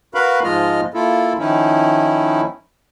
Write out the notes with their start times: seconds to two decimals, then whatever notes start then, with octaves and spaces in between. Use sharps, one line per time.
0.14 F#4 A#4 B4 F5 B5
0.44 G#2 F3 G#3 F4 D#5 F6
0.94 A#3 E4 F4 A4
1.39 D#3 F3 C#4 D#4 E4